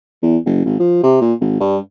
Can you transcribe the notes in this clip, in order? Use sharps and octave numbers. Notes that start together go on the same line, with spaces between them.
E2
F#1
G#1
F3
C3
A#2
G#1
G2